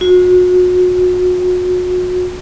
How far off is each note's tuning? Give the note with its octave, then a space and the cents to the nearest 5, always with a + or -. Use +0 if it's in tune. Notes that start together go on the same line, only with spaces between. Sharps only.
F#4 -35